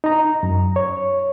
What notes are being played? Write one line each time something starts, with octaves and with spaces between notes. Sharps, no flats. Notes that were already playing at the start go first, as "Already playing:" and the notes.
D#4 A#5
F#2
C#5